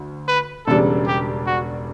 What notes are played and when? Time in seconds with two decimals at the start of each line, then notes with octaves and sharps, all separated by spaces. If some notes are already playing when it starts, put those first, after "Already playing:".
Already playing: D2 D3
0.28 B4
0.67 E1 E2 C#3 G3 D4 A4
1.07 G4
1.47 F#4